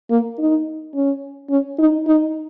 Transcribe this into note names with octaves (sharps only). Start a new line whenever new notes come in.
A#3
D#4
C#4
C#4
D#4
D#4